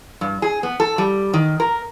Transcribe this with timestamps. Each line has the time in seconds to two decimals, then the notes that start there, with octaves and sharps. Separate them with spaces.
0.21 G2
0.42 G#4
0.63 B3
0.80 A4
0.98 G3
1.34 D#3
1.60 A#4